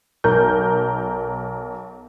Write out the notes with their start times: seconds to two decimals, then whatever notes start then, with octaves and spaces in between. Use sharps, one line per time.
0.24 B1 A#4 G6